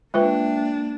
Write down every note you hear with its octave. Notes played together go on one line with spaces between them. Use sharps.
G#3 A#3 D4 F4 B4 E5 G5 F#6